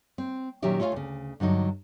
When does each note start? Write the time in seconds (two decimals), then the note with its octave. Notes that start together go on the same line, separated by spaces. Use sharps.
0.18 C4
0.62 A#2 D#3 F#3 C#4 G4 E5
0.80 A3 F4 C#5 D5 F5 G#5
0.92 D2 C#3
1.40 G2 D3 F#3 D#4